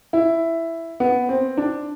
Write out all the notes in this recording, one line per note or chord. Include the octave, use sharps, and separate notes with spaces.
E4
B3
C4
D4